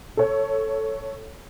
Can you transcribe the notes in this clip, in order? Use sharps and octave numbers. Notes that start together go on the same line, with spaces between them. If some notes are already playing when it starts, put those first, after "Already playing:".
A4 C#5